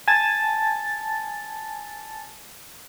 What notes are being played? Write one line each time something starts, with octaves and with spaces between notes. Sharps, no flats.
G#5 A5 A6